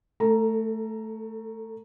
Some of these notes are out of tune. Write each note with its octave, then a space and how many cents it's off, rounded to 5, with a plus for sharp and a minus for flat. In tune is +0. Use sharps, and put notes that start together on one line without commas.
A3 +0 A4 +30 A#5 +0